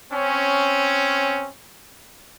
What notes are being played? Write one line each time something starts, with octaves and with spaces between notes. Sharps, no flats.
C4 C#4